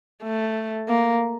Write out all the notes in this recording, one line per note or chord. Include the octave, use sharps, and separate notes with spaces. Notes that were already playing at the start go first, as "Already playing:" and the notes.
A3
A#3